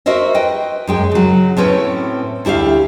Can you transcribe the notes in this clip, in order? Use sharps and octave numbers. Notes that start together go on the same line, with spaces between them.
F#4 A#4 C5 D#5 E5
B4 D#5 G5
F#2 G#3 G5
C#3 F#3
A2 C4 C#4 B4
D2 E4 G4 E5 F5